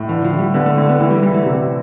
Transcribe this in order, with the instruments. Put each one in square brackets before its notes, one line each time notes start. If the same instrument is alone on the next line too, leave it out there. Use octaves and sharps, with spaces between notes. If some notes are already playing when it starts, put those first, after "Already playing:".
Already playing: [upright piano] A2
[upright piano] D3 [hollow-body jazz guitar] E3
[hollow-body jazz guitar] F3
[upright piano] D3
[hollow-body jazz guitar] G3
[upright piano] D3 [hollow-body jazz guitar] B3
[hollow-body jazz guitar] A3
[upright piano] D3 [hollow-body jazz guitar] A3
[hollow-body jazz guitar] B3
[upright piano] E3 [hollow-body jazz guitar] A3
[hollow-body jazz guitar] G3
[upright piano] E3 [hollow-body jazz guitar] G3
[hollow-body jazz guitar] A3
[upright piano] C3